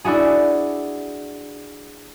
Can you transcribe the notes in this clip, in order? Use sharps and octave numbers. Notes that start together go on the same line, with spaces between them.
D4 E4 F#4 G#4